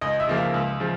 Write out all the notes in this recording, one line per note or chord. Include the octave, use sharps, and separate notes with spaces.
C#2 D#5
E5
C#3 F3 A#3
F5
C#2
C#3 F3